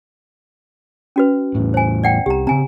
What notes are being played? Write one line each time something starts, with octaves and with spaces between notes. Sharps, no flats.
C#4 F#4 B4
E2 A2
C5 G#5
D5 F#5 G5
C2 G4 A#5
C#3 C4 G#5 A#5